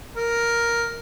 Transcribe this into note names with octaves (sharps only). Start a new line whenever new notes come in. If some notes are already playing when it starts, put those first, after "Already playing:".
A#4